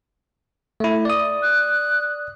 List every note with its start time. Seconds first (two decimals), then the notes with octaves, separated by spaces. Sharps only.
0.80 A3 E4
1.05 D5 D#6
1.42 F#6